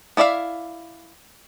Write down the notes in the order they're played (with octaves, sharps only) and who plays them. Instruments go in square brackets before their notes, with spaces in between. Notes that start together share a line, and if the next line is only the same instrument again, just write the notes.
[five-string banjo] B3 E4 D5 E5 F5